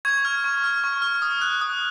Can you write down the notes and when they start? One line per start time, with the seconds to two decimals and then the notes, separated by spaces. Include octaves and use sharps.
0.05 C#6 G#6
0.25 F6
0.44 C#6
0.64 F6
0.84 C#6
1.02 F6
1.22 D#6
1.41 F#6
1.61 D#6